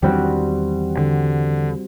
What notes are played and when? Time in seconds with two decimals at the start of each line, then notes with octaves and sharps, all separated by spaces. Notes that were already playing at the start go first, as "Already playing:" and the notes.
0.02 E2 D#3 E3 G3 C4 F#4
0.98 D3